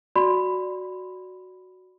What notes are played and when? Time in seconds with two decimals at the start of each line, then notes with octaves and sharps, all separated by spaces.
0.16 F#4 D5 B5 C6